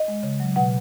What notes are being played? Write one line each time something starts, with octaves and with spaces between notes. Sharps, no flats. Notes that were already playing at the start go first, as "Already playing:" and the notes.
Already playing: D#5
G#3
C#3
F#3
B2 F#5